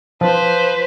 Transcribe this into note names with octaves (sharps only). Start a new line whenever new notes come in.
F3 B4 C5